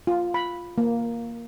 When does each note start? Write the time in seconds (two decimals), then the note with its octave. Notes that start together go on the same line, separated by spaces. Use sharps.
0.07 F4
0.34 B5
0.78 A#3